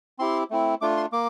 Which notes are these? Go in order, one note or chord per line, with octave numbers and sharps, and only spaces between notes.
C4 E4 G4 C6
A3 C4 E4
A3 D4 F4 D6
C6
A#3 D6